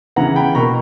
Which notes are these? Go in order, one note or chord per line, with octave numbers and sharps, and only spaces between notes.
C#3 E3 B3 F#5 A#5
G5 B5
B2 A#3 A#5 C#6